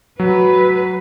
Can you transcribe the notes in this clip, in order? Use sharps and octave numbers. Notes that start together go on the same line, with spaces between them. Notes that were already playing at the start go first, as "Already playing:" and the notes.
F#3 B4